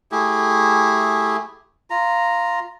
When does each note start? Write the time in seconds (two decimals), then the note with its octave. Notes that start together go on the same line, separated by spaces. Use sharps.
0.12 A3 E4 G4 G#4
1.90 F4 A#5